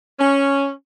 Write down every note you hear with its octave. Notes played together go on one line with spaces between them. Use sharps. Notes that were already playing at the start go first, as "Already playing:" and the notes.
C#4